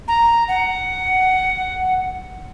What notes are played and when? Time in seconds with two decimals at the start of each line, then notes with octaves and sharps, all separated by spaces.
0.08 A#5
0.48 F#5